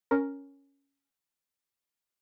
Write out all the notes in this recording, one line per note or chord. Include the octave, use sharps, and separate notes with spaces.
C#4 A#4